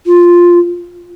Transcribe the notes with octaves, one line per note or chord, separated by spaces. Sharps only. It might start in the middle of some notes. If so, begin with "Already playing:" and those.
F4